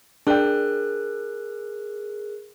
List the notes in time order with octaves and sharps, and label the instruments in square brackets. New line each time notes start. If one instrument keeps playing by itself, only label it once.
[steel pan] D4 G5 [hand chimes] G#4 A#4 F#6